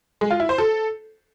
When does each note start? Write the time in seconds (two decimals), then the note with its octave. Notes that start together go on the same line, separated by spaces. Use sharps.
0.21 G#3
0.30 F4
0.40 E4
0.49 C5
0.58 A4